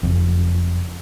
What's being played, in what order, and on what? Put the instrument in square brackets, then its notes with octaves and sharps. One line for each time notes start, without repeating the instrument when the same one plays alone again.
[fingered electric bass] F#1 F2